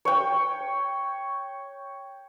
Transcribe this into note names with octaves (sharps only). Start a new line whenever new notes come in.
C#5 G5